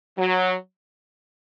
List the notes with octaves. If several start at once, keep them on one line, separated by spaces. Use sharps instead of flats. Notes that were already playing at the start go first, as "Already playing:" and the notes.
F#3